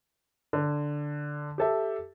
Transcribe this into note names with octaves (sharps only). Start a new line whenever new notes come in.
D3
G4 A4 E5